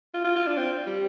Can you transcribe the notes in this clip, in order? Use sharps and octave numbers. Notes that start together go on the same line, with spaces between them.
F4
F4
F4
D4
C4
G3